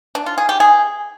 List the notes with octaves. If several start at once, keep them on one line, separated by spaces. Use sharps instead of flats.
D4
F4
G#4
G4
G#4